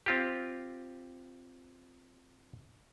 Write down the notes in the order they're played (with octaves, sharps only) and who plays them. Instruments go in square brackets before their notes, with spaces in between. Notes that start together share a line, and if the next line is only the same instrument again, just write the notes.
[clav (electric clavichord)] C4 F4 G4